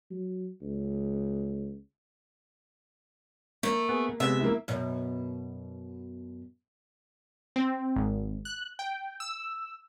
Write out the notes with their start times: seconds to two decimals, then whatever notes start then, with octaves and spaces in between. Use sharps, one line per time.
0.11 F#3
0.62 C#2
3.63 A3 A#3
3.89 B3 G#4
4.20 C3 G#3 B3 E5
4.40 A#3 E4
4.68 F#2 B2
7.56 C4
7.96 G#1
8.45 F#6
8.79 G5
9.20 E6